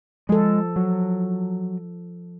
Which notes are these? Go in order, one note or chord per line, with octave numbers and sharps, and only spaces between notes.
F3 G#3 A4
F#3